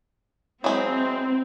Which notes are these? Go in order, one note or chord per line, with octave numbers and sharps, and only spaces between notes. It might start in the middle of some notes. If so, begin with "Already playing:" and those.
F#3 G#3 C4 E4